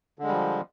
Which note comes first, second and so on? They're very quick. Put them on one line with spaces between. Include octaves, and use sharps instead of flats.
D3 G#3 G3 F3